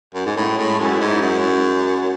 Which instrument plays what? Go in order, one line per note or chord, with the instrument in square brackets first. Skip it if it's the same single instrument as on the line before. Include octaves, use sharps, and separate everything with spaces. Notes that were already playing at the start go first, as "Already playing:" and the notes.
[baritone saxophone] F#2
G#2
[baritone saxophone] A2 [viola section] G#3 C#4 E4
[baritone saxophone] A2
F#2
G#2
F#2